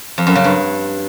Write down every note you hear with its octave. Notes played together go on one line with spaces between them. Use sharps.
F2
F#2
C#3
G2